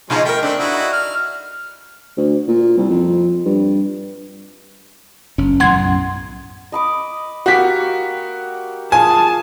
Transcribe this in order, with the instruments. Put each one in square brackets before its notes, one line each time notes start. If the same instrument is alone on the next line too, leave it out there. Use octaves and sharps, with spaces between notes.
[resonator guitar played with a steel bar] B2 D#4 A5 [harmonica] F3 G#3 C#4
[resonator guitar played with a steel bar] A3 A#4 [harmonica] G5
[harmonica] A3 C4 [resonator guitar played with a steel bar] D4
[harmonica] D#4 E4 F#4
F6
[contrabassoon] D2
A#2
C2
F2
G2
[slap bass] F#1 C#4
[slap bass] B1 F#2 A2 [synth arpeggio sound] F#5 C6 G#6
[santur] D#5 B5 D6
[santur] A#3 G4 C#5 [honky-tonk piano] F#4 B6
[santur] F4 G#4 [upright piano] G#5 [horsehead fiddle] A5